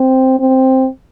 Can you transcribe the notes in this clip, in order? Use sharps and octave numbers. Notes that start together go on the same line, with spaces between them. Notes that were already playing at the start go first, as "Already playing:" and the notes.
Already playing: C4
C4